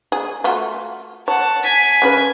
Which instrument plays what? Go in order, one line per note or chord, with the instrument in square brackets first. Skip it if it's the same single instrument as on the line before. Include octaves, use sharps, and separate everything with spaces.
[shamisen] G#4
A3 F4 F#4
[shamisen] C#5 [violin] F#5 A5
[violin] G#5 B6
[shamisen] C#3 C#4 B4